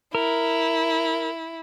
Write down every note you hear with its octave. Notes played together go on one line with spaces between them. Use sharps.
E4 A#4